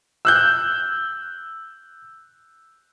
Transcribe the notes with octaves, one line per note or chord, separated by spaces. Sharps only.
E6 F#6 G6